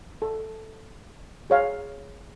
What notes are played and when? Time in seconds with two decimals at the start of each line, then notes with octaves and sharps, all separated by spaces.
0.22 A4
1.50 G#4 C#5 F5